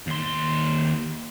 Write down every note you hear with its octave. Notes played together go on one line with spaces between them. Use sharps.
D#2 C6